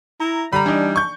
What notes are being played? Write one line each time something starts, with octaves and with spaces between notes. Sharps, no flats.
E4 A#5
D3 G3 A#5 B5
E3 D4 D#4
C#6 G6